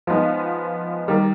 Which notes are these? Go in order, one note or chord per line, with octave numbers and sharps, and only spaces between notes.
F3 G#3 B3 D#4
D#3 G3